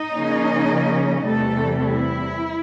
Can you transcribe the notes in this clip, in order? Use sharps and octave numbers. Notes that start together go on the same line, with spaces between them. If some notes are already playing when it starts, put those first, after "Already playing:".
Already playing: D#4 D#5
C#3 F3 A#3 C#4
E2 C3 E3 G3 A3 A4
E4